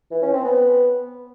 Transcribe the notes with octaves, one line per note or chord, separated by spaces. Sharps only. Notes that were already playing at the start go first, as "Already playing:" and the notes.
E3
C#4
C4
B3